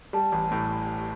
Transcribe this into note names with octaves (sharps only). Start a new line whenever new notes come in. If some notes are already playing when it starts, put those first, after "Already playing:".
G3 A5
A1
A2